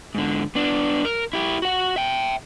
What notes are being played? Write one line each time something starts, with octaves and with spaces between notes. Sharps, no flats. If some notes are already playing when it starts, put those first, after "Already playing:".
G#2 D3
B3 D4
A#4
E4 G4
F#4 F#5
E5 G5